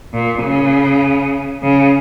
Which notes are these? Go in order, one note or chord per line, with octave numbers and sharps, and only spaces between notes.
A#2
C#3
C#3